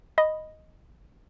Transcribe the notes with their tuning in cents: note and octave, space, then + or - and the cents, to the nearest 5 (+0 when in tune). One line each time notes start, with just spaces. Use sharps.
D#5 +0 B5 +0